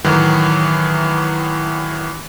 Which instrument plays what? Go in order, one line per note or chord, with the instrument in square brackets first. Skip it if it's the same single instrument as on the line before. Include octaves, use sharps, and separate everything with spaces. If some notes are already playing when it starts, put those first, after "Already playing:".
[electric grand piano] A2 D#3 E3 F#3